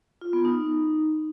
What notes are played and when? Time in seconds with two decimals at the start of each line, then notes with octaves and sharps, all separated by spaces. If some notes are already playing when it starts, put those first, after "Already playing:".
0.21 F4
0.33 B3
0.45 D#4